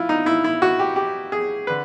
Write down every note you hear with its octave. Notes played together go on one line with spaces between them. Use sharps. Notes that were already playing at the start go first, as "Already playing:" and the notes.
Already playing: F3 E4 F4
D#4
E4
E4
F#4
G4
G4
G#4
D3 B4